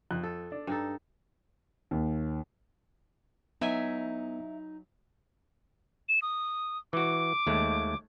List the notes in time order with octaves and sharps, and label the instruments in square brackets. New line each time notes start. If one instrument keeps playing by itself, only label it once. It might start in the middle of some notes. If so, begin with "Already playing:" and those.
[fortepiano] F2 F#6
[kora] A4
[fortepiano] D4
[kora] G2 D#4 A4
[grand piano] D#2
[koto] F#3 E5 G#5 [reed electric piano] B3 [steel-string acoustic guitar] D#4 [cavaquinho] E4
[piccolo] E7
D#6
[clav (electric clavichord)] E3 F#4 [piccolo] D6
[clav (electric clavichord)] D#2 G#3 A3